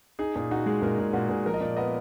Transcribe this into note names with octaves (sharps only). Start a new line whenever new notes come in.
D#4 G#4
A#2 G#4
D#4 F#4
G#3 G#4
A#2 A#4
A#2 G#4
A#2 F#4
A#2 G#4
F3 A#4
D#5
A#2 D5
B3 D#5